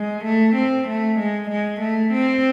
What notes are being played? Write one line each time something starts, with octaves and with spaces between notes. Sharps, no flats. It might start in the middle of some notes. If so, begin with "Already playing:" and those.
Already playing: G#3
A3
C4
A3
G#3
G#3
A3
C4